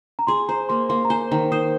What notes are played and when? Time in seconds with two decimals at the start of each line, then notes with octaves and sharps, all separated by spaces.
0.19 A#5
0.27 G#4 C6
0.48 C5 A#5
0.69 A#3 C6
0.89 A#3 C6
1.05 A#5
1.10 C5 G#5
1.32 D#3 A#5
1.52 C5 D#6